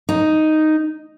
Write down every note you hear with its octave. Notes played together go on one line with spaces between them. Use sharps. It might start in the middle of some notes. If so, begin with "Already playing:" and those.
D#4